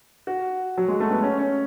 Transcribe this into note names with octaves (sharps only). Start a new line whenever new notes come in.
F#4
F#3
G#3
A3
B3
C#4
C#4